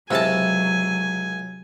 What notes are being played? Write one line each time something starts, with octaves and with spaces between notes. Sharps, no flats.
C#2 C3 F#3 E4 A4 G#5 A5